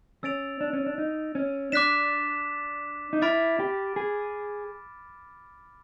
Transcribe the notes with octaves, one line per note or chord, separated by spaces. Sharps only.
C#4 E6 A6 D7 F7
D4
C#4
D4
D#4
C#4
D4 D6 F#6 B6 E7
D#4
E4 B5 D6 F6 A6 D7
G4
G#4